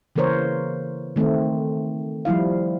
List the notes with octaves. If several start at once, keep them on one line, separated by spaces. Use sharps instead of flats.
C#3 E3 A#3 A#4 C5 C#5
D#3 A3 C4
F3 G3 E4 F5